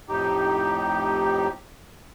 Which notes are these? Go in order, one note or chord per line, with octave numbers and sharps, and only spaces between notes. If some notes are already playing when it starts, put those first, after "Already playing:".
F2 A2 D#4 G4